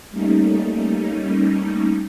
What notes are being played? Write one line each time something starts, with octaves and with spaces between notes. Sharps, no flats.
G3 A3 A#3 C#4 D#4